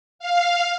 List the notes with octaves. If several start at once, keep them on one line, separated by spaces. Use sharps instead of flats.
F5